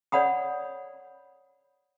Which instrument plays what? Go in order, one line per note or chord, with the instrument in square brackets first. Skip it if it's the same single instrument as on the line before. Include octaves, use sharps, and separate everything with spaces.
[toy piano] C#5 D5 F#5 B5 D#6